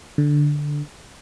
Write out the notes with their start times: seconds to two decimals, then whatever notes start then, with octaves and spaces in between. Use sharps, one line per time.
0.18 D3